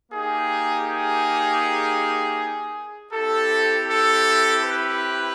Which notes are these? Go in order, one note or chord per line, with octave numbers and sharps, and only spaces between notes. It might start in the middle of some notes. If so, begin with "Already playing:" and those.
A#3 D#4 G4 G#4
G#4
C4 E4 G4 A4
A4
B4